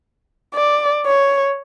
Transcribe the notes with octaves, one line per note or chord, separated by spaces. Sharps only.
D5
C#5